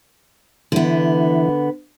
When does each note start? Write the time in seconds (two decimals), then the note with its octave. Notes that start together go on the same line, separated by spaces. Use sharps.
0.72 D3 E3 B3